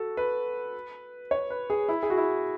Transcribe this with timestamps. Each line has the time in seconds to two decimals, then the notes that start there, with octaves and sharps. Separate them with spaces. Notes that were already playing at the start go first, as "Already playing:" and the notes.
Already playing: F#4 A4
0.17 B4
1.31 C#5
1.50 B4
1.70 G#4
1.89 E4
2.03 G#4
2.10 F#4
2.17 E4